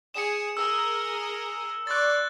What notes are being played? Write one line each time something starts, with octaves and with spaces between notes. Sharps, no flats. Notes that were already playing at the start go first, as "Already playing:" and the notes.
G#4 C#7 E7
G#4 A#4 D#6 E6
D5 C6 C#6 F#6 A6